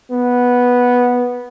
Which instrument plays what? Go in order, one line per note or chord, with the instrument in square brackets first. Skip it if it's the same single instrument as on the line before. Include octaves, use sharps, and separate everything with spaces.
[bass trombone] B3